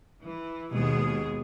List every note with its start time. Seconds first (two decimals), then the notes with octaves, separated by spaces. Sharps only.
0.24 E3
0.71 D#2 B2 G#3 G#4